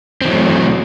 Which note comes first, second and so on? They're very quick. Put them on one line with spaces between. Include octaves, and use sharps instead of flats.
C4 E3 F#3 A3